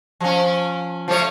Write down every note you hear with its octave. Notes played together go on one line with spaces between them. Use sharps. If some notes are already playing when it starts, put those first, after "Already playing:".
F3 C#4
F3 A3 C#5